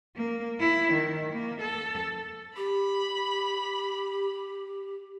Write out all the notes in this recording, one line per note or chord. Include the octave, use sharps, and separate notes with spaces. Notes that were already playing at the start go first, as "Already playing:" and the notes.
A#3
E4
D#3
A#3
A4
G4 B5